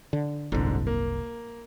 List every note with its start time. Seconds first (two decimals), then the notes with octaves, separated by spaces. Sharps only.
0.13 D3
0.52 F#1 C2 G#2 D3
0.87 A#3